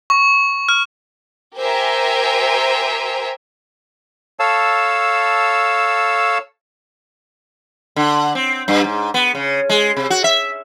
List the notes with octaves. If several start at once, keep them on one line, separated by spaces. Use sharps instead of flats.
C#6
F6
G4 A#4 C5 E5 G#5 A#5
A4 C#5 F5 A5 E6
D3
C4
G2
G#2
B3
C#3
G#3
C3
F#4
E5